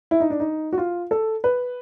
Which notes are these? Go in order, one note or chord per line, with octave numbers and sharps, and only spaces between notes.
E4
D#4
D4
D#4
F#4
F4
A4
B4